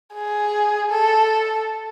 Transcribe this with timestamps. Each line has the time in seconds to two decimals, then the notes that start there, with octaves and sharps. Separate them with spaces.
0.14 G#4
0.90 A4